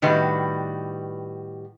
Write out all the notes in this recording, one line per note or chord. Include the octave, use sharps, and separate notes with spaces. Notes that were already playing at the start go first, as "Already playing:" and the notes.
A2 D#3 G3 F#4 B4